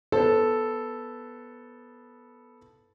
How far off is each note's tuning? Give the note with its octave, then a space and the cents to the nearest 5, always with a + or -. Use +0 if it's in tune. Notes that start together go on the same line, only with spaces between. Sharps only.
B3 -10 A4 -5 C5 +25